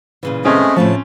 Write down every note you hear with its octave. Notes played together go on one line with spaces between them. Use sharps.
A#2 C#3 E3
G#3 A3 C4 C#4 G#4
A2 C#3 F3 A3 A5